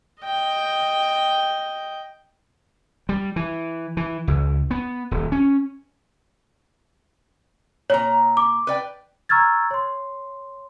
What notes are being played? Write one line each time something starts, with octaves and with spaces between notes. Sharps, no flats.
D#5 G5
G3
E3
E3
C#2
B3
D#1
C#4
A#2 C#5 A#5
D6
B4 D5 G5
A#5 C#6 E6 F6 G#6 A6
C#5 C6